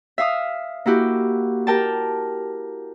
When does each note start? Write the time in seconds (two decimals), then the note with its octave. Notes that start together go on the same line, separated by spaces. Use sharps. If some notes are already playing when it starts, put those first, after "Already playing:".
0.18 E5 F5 D#6
0.86 A#3 E4 F#4 G4
1.67 G4 A#4 G5 A5